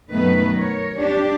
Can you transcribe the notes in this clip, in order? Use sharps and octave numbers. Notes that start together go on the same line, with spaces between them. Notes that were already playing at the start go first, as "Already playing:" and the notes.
F#2 B2 D#3 A3 B3 B4
A#4 C#5
D4 G4